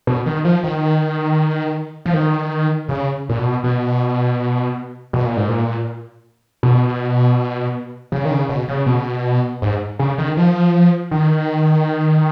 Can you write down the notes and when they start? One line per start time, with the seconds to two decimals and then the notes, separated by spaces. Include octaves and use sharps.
0.07 B2
0.26 D#3
0.45 F3
0.64 D#3
2.06 F3
2.14 D#3
2.89 C#3
3.29 A#2
3.38 B2
3.64 B2
5.13 B2
5.25 A#2
5.37 G#2
5.49 A#2
6.63 B2
8.12 C#3
8.25 D#3
8.31 C#3
8.49 B2
8.68 C#3
8.86 B2
9.62 G#2
9.99 C#3
10.18 D#3
10.37 F3
11.11 D#3